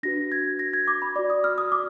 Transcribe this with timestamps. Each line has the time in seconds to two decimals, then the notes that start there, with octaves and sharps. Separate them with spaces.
0.03 D4 F#4 B4 A#6
0.32 G#6
0.59 A#6
0.73 G#6
0.87 D6
1.02 B5
1.16 F#4 D5 D6
1.30 D#6
1.44 F6
1.58 D#6
1.72 D6